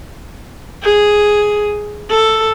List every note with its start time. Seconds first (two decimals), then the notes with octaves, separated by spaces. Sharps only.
0.83 G#4
2.10 A4